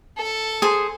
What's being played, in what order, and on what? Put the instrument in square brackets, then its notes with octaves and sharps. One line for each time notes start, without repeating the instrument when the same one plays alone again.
[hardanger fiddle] A4 A5
[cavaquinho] G#4 C5